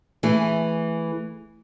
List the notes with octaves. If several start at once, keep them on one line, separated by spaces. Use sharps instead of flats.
E3 A3 G#4